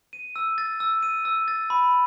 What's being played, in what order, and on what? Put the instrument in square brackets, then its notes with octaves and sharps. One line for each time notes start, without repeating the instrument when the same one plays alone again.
[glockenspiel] D#7
E6
A6
E6
D#7
E6
A6
B5